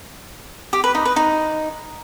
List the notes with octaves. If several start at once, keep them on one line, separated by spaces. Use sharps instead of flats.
G4
B4
D#4
B4
D#4